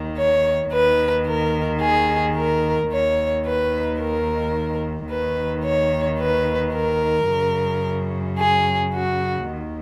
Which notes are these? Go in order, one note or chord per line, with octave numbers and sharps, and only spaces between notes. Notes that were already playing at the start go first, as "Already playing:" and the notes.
Already playing: D#2 D#3
C#5
D#2 D#3 B4
A#4
G#4
A#4
D#2 D#3 C#5
B4
A#4
D#2 D#3 B4
C#5
B4
A#4
F#2 C#3
G#4
F#4
D#2 D#3